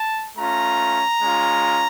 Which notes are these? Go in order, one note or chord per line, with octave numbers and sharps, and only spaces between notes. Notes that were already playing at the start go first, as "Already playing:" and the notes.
Already playing: A5
A3 C#4 F4 A#5
G#3 C#4 F4